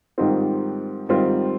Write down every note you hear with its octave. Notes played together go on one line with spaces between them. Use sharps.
G#2 D#3 G3 C4 F4
G#2 D#3 G3 C4 F4